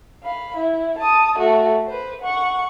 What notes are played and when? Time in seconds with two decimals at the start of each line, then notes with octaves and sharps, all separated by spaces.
0.23 F5 B5
0.57 E4
0.99 A5 D#6
1.38 A3 F#4
1.87 B4 C5
2.22 F#5 C#6